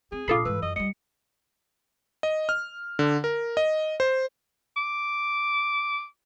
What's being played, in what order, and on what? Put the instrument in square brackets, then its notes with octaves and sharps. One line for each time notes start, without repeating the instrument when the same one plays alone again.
[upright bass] C4 [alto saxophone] G#4
[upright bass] A#1 C#3 [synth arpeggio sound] F4 A4 B5 [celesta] D6 D#6 C7
[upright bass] G#2 E3 [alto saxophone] B4 [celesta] E6
[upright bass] F#2 [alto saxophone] D#5
[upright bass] F#3 G3 [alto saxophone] D#5 [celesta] C#7
[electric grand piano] D#5
F6
D3
A#4
D#5
C5
[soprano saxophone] D6